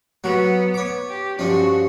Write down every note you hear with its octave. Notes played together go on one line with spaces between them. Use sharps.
F#3 B3 F#4
C#5 D6
G4
G2 F3 C#4 F#4